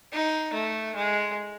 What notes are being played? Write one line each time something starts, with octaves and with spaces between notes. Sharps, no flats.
D#4
A3
G#3